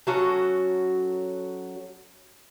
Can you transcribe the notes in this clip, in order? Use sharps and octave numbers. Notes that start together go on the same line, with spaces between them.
F#3 C#4 F#4 A4